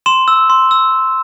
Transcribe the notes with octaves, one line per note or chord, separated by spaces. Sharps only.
C6 E7
E6
C6
E6